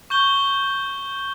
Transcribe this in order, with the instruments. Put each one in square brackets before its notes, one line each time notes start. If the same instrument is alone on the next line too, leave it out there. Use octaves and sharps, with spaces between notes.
[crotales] C#6 G6 G7